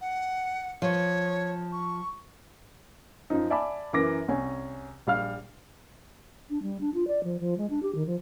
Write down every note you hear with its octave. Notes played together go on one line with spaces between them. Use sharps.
F#5
F3 C#5
C#6
F#2 F3 D#4
D5 E5 G#5 A5 B5 D6
F#2 E3 A#4 D6 A#6
C2 C#4 G#5
A#1 G3 F5 F6
D4
G3
D4
F4
D5
F3
F3
G#3
D4
G4
D#3
F3